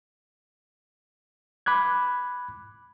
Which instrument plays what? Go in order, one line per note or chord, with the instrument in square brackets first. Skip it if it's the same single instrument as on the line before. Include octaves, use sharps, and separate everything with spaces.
[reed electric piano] B5 D6 F#6 G#6